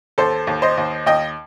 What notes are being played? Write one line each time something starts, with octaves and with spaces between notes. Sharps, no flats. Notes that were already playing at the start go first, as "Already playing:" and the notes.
D#2 A4 C5
D#2
C5 D#5
D#2
D#2 D#5 G5